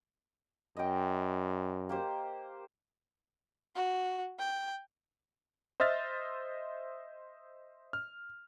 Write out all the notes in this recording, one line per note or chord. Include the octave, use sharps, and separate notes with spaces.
F#2 D#5 G5
A#3 G4 C5
F#4
G5
C5 D#5 E5 F6 A6
F6